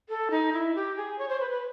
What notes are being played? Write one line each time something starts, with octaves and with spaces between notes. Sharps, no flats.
A4
D#4
E4
G4
G#4
C#5
C5
B4
B4